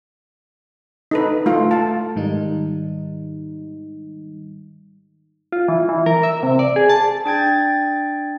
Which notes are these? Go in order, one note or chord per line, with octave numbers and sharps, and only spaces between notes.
D#4 A4 B4
A3 F4 F5
F5 A5
G#2 D#3 G3 D#4
F4
E3
E3
A#4
E5
C3
D5
G#4
A5
D4 G5 G#6 A6